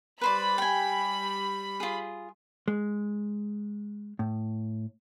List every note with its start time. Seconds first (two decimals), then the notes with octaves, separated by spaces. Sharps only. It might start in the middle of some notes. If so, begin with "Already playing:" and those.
0.21 G3 B4 C5 D5 B5
0.58 G5 G#5
1.80 F4 G#4
2.68 G#3
4.19 A2